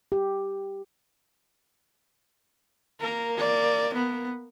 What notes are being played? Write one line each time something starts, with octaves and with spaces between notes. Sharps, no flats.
G4
A#3 A#4
D5
B3